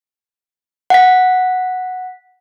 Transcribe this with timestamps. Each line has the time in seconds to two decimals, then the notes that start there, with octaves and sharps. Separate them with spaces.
0.90 F#5 B6